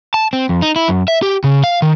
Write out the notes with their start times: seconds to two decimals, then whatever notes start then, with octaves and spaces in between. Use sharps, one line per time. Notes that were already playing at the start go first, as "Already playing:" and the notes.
0.14 A5
0.33 C4
0.49 F2
0.62 D#4
0.76 E4
0.88 F#2
1.08 E5
1.23 G4
1.44 C#3
1.64 F5
1.82 D#3